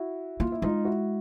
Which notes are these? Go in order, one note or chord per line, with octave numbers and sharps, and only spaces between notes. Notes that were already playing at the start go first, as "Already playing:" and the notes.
Already playing: E4 F#4
A#3 F4
E4
G#3 D#4 F4
E4 F#4